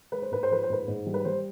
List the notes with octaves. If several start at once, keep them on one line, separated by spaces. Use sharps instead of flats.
G#3 B4
C5
G#2 B4
C5
F3 B4
C5
G#2 B4
G#2
G3
B4
G3 C5